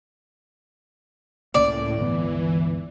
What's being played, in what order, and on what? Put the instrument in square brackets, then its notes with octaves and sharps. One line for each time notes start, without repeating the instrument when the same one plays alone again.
[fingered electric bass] C#2 C#3 A#3 [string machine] A2 [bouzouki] D5
[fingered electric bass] G1 C#2 B3 [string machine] E3